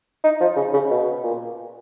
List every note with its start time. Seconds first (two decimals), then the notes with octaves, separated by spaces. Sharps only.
0.24 D#4
0.40 F3
0.56 C#3
0.73 C#3
0.91 B2
1.23 A#2